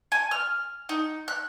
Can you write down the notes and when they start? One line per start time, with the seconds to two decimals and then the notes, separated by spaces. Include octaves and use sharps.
0.12 G#5
0.31 F6
0.89 D#4
1.28 F#6